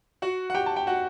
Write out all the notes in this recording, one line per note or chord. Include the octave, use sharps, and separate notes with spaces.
F#4 F#5
F#5
G4 G5
A5
G5
F#4 F#5